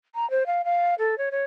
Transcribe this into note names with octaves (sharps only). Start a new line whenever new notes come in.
A#5
C5
F5
F5
A4
C#5
C#5